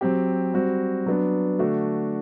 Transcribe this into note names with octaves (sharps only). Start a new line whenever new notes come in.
F#3 C4 G4
G3 C4 F#4
F#3 B3 D4
D3 A3 D4 F#4